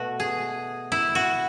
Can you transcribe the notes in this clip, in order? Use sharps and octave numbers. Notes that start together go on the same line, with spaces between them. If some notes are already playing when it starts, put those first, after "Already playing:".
Already playing: B2 A3 F#4
G#4
E4
F#4